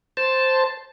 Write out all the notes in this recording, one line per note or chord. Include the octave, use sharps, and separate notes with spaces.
C5 A5